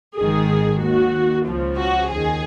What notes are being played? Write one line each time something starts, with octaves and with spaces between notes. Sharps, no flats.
G#1 G#2 D#3 G#4
D#2 D#3 F#4
C#2 C#3 F3
F#4
D#2 D#3 G#4